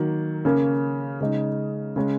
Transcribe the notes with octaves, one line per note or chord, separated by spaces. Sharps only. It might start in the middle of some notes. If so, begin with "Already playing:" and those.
Already playing: D#3 F#3 A#3
C#3 A#3 C#4
C#3 G#3 D#4
C#3 G#3 C#4